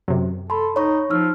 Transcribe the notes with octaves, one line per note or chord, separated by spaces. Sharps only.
F#2 C3
A4 A5 B5 C6
D#4 C#5 B5 C#6
F3 D#4 E6 F6